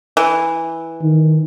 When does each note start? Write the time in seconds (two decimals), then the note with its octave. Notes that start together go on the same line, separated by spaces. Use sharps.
0.17 E3
1.02 D#3